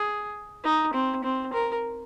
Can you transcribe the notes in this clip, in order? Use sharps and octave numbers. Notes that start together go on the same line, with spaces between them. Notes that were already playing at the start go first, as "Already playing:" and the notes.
Already playing: G#4
D#4
C4
C4
A#4